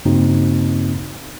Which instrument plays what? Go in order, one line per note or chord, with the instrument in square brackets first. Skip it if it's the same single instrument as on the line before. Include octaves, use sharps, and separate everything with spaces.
[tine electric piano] G2 C#3 A#3 C4 D#4 F#4